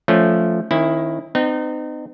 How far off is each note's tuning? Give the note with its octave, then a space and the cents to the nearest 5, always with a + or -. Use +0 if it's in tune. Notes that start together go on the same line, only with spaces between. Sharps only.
F3 +0 A3 +0 C#4 +15
D#3 +0 C#4 -45 E4 +0
C4 -45 D#4 -30